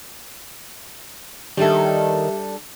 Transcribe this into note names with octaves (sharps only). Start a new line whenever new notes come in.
D#3 G3 D4 G4 A4 E5